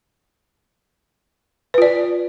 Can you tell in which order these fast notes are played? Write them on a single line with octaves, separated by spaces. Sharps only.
B4 F4 D5